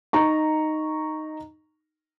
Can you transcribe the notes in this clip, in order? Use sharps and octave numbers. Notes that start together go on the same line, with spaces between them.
D#4 A#5 C#6